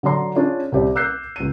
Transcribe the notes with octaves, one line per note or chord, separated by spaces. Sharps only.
D3 F#3 D5 A#5 C6
C#4 D4 F4 G#4 C#5 D5
C2 G4 D5
D6 E6 F#6 G6 C7
C#2 D#7